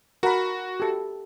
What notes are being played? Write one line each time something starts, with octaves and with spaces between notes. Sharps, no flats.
F#4 A#4 F#5 B5
G4 A4